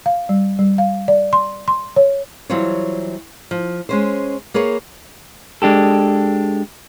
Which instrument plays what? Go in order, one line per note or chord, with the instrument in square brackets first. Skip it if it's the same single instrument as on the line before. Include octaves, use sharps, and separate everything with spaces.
[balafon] F5
G3
G3
F5
D5
C6
C6
C#5
[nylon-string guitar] E3 F#3 G3 F4 C5 C#5
F3
G#3 C#4 C5
A#3 G#4 B4 C#5
[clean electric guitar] G#3 D4 G4 A4